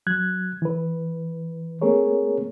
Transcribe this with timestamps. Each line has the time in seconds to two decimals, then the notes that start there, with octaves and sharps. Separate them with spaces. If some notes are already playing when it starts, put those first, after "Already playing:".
0.07 F#3 F#6 G#6
0.62 E3 B4
1.81 A3 A#3 C4 G#4 A#4 C#5